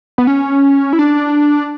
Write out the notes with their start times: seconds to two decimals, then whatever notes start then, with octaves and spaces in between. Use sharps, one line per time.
0.18 B3
0.27 C#4
0.93 E4
0.99 D4